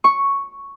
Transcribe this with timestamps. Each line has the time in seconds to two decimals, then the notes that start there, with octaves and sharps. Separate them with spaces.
0.04 C#6